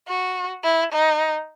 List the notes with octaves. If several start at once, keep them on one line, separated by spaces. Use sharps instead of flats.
F#4
E4
D#4